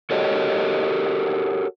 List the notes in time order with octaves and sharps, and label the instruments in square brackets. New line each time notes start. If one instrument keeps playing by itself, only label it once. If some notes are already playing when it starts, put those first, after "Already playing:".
[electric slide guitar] F#4 G4 A4 A#4 C#5 D#5